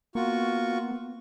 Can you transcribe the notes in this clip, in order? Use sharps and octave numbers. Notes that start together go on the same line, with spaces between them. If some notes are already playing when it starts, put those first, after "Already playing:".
A#3 B3 F4 F#4 C#6